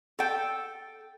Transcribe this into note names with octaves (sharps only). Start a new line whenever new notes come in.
A4 G5